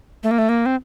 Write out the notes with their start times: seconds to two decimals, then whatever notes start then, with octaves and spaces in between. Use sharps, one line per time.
0.23 A3
0.31 A#3
0.38 A3
0.49 A#3
0.66 C4